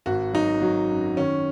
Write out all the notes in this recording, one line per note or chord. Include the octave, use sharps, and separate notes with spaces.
G#1 F#4
F#3 D#4
F#3
F#2
D#3 C#4